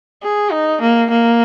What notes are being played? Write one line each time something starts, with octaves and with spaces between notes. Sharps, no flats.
G#4
D#4
A#3
A#3